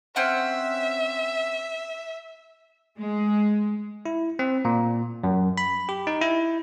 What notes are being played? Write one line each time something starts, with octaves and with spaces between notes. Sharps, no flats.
C4 C#4 E5 F#5
G#3
E4
C4
A#2
F#2
B5
G4
D#4
E4